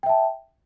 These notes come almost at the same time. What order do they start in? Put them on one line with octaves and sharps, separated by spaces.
G5 E5 A5